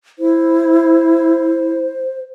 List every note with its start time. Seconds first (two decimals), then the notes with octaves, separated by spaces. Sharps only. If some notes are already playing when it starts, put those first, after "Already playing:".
0.19 E4 C5